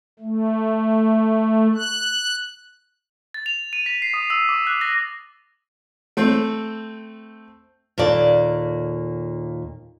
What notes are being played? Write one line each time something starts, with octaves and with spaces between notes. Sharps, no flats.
A3
F#6
A6
F7
D#7
B6
C7
D#6
E6
D6
F#6
A#6
A3 C4
D#2 A#2 A4 D5